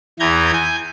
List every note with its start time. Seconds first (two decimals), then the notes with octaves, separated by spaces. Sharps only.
0.20 E2 E3 A#5 G6 G#6
0.53 G#5 G6